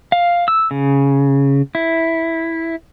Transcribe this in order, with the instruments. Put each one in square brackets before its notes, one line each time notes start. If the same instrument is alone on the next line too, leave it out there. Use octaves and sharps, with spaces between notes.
[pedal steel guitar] F5
E6
C#3
E4